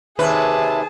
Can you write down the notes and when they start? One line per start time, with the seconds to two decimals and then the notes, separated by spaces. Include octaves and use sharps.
0.19 D#2 C3 G#4 B4 E5 A5